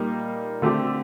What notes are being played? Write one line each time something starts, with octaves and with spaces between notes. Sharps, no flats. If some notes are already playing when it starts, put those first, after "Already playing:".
Already playing: A#2 G3 A#3 D#4
D3 A3 C4 G4